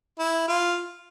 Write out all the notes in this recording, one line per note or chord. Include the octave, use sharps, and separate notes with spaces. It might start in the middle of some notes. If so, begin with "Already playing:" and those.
E4
F4